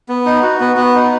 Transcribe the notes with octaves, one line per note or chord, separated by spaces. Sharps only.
B3
D#4
F#4
B3
B3
D#4